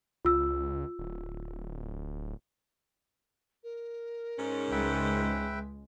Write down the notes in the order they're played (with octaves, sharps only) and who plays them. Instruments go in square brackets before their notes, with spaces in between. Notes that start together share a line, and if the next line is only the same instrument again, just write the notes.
[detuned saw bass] C#2 [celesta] F4 E6
[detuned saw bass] D1
[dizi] A#4
[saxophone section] G#2 C#4
[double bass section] C#2 G#3 [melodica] B4 E5 G5